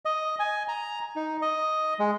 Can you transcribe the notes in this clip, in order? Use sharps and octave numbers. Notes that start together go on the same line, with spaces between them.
D#5
G#5
A#5
D#4
D#5
G#3